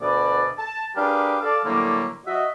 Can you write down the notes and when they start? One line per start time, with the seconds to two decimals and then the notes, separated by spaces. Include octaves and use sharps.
0.01 D2 B2 B4 D5
0.59 A5
0.96 D4 G4 G#4 A#4 B4 F5
1.42 A4 D5 F5
1.65 A2 D3 F#3 G3 A#3
2.27 F#4 D#5 E5